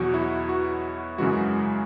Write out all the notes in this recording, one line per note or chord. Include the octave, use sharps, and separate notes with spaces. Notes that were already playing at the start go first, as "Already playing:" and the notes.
Already playing: E2 B2 F#3 F#4
E4
F#4
F#2 C#3 E3 G#3 F#4